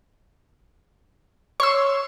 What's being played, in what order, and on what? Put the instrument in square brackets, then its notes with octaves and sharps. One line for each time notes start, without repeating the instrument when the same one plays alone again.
[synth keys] C#5 C6 [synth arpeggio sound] C#6 E6